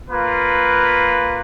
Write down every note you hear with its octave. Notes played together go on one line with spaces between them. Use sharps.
A#3 F4 B4